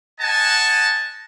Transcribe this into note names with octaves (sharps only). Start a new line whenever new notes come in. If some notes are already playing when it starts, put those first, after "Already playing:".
D#5 F#5 G#5 A5